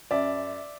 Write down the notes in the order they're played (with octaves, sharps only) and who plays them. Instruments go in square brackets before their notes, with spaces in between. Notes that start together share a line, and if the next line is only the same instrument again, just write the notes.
[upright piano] F#2 D5 E5